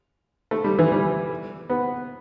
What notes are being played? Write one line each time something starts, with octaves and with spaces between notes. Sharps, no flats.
A3
G3
E3
G3
B3